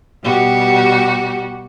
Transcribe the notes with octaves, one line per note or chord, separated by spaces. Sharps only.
B2 G3 F#4 G4